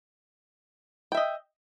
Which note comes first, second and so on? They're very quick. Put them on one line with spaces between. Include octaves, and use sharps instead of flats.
G5 E5 D#5